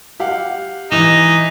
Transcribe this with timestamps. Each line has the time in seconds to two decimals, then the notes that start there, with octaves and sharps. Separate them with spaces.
0.20 G4 F5 F#5
0.91 E3 D#4 E7